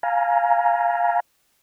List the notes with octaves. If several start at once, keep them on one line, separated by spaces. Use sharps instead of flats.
F5 G#5 A#5